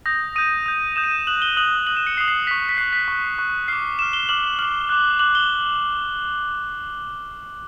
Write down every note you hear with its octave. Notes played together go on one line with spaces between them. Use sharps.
D#6 G6 A#6
D#6 G6 D#7
D#6 G6
D#6 G6 E7
D#7
E7
D#6 F#6 F#7
G7
D#6 F#6 F#7
D#6 F#6 F#7
E7
C#7
D#6 F#6 C7
C7
C#6 F#6 B6
B6
C#6 F#6 C7
B6
C#6 F#6
C#6 F#6
D6 F6 C7
D6 F6 E7
G7
D6 F6 F#7
D6 F6 F#7
D6 F#6
D6 F#6 F#7
G7